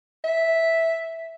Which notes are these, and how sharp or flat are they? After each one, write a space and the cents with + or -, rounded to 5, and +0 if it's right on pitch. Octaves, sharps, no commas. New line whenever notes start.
E5 -5